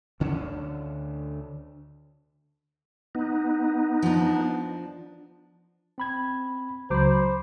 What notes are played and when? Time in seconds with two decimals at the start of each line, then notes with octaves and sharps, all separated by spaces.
0.20 D2 D3 C#4
3.15 B3 D#4
4.03 F3 D4
5.98 C4 B5 G#6
6.90 C#2 F#3 C5 A#5 B5 D6